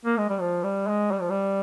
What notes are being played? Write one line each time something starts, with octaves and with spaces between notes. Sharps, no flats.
A#3
G#3
G3
F3
G3
G#3
G3
F3
G3